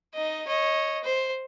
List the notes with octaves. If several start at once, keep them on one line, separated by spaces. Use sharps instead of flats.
D#4 D#5
C#5 D#5
C5